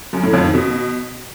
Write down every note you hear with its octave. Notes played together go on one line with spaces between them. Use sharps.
F#2
A2
F2
D#3
B2